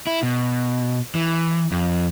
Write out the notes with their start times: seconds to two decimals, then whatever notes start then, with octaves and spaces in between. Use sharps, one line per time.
0.07 E4
0.23 B2
1.15 E3
1.72 F2